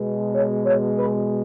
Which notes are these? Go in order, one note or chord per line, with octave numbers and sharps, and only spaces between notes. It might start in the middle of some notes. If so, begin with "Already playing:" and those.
Already playing: B2 G#3
C#5
C#5
B4